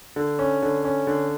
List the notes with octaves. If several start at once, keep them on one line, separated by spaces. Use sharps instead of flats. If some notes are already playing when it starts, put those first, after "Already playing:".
D3
C#4
D3
C#4
D3